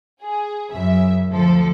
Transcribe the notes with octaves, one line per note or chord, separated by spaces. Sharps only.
G#4
F#2 C#3 E5
D2 F3 A4